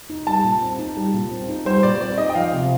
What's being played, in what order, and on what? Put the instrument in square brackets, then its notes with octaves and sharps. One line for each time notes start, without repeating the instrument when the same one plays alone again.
[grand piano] D#4
[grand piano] G3 [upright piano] A5
[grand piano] A#2
C4
D#4
G3
A#2
C4
D#4
[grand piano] G3 [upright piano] C5
[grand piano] A#2 [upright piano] D5
[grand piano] C4 [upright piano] D5
[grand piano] D#4 [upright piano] D#5
[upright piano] G5
[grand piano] F3 [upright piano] F5
[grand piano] C3